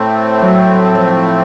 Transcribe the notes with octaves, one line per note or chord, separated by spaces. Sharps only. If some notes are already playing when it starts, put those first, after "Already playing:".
Already playing: A2 A3 C4
F#3
F3